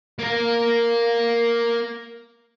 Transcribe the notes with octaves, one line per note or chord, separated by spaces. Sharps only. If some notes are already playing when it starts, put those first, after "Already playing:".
A#3 A#4